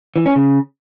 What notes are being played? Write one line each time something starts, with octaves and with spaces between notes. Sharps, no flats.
E3
C#4
C#3